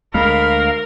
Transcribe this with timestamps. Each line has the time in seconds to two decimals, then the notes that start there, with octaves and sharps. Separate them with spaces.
0.14 D2 G#3 A#4 F5 B5